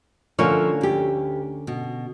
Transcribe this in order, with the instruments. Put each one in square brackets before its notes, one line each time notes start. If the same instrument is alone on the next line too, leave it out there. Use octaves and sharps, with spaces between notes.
[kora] D3 C#4 A#4 [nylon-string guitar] F3 A3
[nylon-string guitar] D2 G4
B2